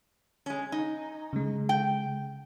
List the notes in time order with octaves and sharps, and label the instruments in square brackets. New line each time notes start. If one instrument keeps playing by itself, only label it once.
[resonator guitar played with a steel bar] G#3 C#4 [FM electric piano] G#5
[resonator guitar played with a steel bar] D#4
[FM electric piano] C#3 G#3
[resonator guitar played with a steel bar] G5